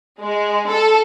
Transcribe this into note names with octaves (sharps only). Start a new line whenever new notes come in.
G#3
A4